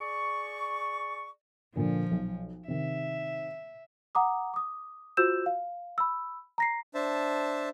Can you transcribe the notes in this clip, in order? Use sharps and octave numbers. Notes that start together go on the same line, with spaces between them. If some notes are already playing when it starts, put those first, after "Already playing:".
G#4 D5 C#6
A#2 D3 F3
B1
C3 D#3 E5
F#5 A#5 D6 D#6
D6 D#6
F4 F#4 C5 E6 G6 E7
F5
B5 E6
A#5 A#6 C7
D4 C5 E5 A5